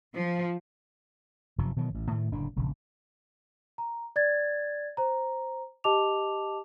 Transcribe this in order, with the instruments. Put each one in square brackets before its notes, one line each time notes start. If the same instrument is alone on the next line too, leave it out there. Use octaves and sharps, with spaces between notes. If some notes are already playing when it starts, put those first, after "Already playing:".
[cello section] F3
[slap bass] F1 F#2 C3 F3
B2 D#3 E3 F#3
A1
A2 D#3 A3
F#1 A2 D3 D4
E1 A#1 C#3
[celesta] A#5
D5 G#6 A6
C5 A#5
G4 D#5 A5 D6 F7